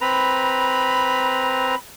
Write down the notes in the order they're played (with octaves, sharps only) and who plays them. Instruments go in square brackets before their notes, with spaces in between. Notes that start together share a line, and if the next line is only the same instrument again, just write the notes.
[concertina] C4 B4 A#5 [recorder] B5